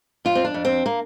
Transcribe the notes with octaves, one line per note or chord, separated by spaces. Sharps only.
F2 F4
C4
D4
F2
C4
A#3